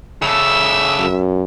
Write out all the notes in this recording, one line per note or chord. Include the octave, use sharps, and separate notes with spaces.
C#3 A4 E5
F#2